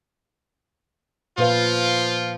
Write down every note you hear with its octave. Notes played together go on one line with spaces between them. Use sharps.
A#2 F3 F4 B4 F5